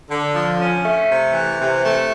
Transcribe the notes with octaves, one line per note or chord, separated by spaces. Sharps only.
D3
F3
C#4
A3
C3
E3
C3
A3